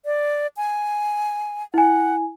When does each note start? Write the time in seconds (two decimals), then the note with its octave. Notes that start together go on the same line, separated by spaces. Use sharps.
0.05 D5
0.57 G#5
1.74 E4 F#5 G#5